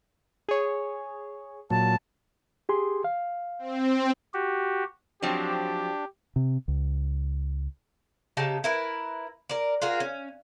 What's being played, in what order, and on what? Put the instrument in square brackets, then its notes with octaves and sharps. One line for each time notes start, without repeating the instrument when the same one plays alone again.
[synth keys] G#4 C#5
[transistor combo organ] A#2 F#3 [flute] A5
[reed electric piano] G4 G#4 C6
F5
[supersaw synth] C4
[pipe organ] F#4 G4
[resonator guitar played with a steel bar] F3 F#3 C4 [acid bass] D4 [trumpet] G4
[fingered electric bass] C3
C#2
[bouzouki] C#3 D#4 G4 A5
E4 A#4 B4
A#4 D5
F4 F#4 G#4 A#4
C#4